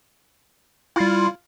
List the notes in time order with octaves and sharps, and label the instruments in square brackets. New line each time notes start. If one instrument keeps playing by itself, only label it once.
[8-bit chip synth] G3 E4 [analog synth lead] F4